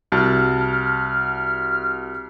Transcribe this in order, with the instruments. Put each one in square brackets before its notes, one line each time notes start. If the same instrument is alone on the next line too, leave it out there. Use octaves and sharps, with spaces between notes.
[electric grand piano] C2 F#4 A5 [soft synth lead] F6